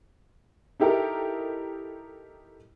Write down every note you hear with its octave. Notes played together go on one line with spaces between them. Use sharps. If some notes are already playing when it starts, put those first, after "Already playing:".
D#4 E4 G4 A4 A#4